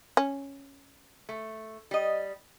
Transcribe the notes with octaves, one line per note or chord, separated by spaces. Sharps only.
C#4
A3
G3 D#5